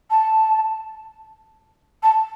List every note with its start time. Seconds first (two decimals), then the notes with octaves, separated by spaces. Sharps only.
0.10 A5
2.03 A5